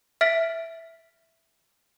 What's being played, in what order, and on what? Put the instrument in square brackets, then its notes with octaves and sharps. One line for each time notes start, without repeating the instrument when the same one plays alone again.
[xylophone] E5 F6 A6 B6 D7 F#7